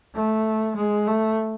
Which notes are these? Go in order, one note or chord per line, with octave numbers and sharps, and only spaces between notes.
A3
G#3
A3